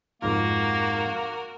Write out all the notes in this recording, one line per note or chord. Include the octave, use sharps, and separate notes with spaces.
F2 G#2 A#3 F4 F#4 A#4